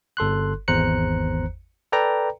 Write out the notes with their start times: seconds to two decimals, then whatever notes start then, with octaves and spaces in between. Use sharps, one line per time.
0.17 G1 A4 C6 F#6
0.68 G#1 E2 C5 A#5 F#6 C#7
1.92 A4 B4 D5 G5 A#5